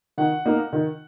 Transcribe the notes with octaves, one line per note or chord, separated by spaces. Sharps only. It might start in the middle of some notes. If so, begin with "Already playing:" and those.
D#3 F#5
A#3 D#4
D#3